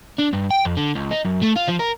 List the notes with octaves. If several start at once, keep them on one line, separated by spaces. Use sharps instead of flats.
D4
G2
G5
F2
D3
C#2
D#4
F#2
A3
F4
F3
A#4